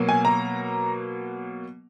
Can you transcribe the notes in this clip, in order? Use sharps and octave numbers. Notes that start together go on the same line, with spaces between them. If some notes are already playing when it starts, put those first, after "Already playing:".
Already playing: B2 F#3 A#3
G#5
A#5